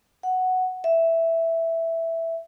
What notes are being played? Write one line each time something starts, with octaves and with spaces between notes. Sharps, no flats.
F#5
E5